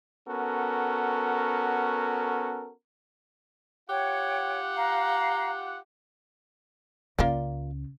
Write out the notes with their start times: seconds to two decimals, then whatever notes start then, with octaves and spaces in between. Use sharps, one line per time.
0.28 B3 C#4 F#4 A4 A#4
3.89 F4 G4 C#5 F#5 G5
4.76 F5 A#5
7.19 C#2 C#3 A#3 F4 D5